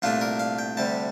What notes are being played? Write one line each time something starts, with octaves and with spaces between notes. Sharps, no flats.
C2 A#2 A3 D4 F4
A#4
F5
G5
D2 C3 G3 A5